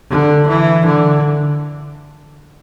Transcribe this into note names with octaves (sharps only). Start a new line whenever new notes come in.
D3
E3
D3